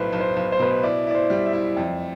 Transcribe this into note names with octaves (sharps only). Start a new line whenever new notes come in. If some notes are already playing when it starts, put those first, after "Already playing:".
Already playing: B1 A2 B4 C5
B1
C5
B1
C5
B2 B4
C5
E4 D5
E4 D5
C5
G3
E5
E4
F2 G5